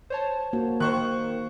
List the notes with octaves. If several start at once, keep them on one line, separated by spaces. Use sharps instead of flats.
C5 C#5 A5
A#3 F#4
D#3 C5 C#6 F#6